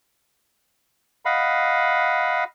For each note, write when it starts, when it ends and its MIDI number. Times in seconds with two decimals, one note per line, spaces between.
1.25 2.44 75
1.25 2.44 77
1.25 2.44 78
1.25 2.44 83